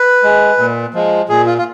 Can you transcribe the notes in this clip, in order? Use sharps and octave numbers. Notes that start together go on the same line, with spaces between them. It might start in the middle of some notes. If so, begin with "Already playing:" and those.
Already playing: B4
G#3
A#2
F3 G#3
A#2 G#4
F4
F4